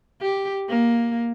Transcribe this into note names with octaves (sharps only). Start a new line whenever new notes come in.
G4
A#3